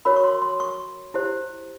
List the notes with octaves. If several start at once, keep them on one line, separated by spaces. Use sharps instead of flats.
F#4 A#4 C#5 B5
C#6
C6
C6
C#6
E4 G4 C5